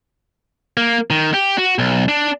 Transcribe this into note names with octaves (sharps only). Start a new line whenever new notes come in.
A#3
D#3
G4
F#4
B1
D4